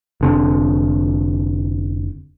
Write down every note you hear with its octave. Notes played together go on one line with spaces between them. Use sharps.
F1 D3 C4